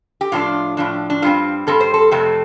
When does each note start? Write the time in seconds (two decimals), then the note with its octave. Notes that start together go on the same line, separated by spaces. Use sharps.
0.21 G4
0.32 A2 F3 D4 F4
0.77 A2 F3 D4
1.10 D4
1.22 G2 G3 C4 F4
1.67 G2 G3 C4 A4
1.80 C5
1.94 A4
2.11 F2 C3 A3 C4